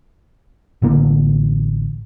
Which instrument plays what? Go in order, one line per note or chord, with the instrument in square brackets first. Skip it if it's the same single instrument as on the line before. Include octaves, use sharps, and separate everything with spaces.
[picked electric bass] A1 D3 A#3